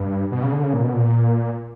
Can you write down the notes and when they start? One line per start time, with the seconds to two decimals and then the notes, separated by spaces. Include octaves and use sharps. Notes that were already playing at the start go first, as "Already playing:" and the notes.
Already playing: G2
0.31 B2
0.43 C#3
0.52 D3
0.63 C#3
0.73 A#2
0.84 B2
0.94 A#2